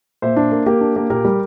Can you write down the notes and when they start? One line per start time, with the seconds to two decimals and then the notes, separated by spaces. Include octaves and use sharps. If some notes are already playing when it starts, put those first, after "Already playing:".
0.22 A#2 C5 E5
0.36 D4
0.52 A#3
0.66 A#3 G4 A#4
0.81 D4
0.96 A#3
1.10 A#2 G4 A#4
1.25 G3